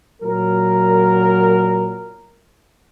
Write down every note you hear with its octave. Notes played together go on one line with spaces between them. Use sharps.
A#2 F#3 A#4